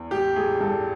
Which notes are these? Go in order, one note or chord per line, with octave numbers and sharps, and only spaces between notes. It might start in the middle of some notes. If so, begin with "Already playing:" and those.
Already playing: E2
A1 G4
A1 G#4
G2 A4